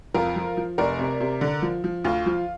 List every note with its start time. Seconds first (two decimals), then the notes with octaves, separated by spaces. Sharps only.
0.14 F2 F4 A#4
0.36 F3
0.57 F3
0.78 F1 A#4 D5
0.99 C3
1.20 C3
1.41 D3
1.62 F3
1.84 F3
2.04 D2 F4
2.26 F3